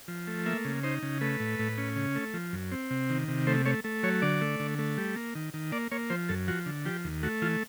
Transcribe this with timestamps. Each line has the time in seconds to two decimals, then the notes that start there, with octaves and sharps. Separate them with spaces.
0.08 F3
0.28 A3
0.46 A#3 E5
0.65 C#3
0.83 D#4 C5
1.02 C#3
1.21 A3 B4
1.40 A2
1.59 A2
1.78 C#4
1.96 C#3
2.16 A3
2.34 F3
2.53 F#2
2.72 C4
2.90 C3
3.10 D#3
3.28 C3
3.47 A3 C5
3.65 A3 C#5
3.84 A3
4.03 F#3 C#5
4.22 D3 D5
4.41 A3
4.60 D3
4.79 A3
4.97 G3
5.16 A#3
5.35 D#3
5.54 D#3
5.72 A#3 D5
5.91 A#3 C#5
6.10 F3 C5
6.29 F#2 A4
6.48 F3 F#4
6.66 D3
6.85 F3 G4
7.04 D#2
7.23 A3 F#4
7.42 E3 F4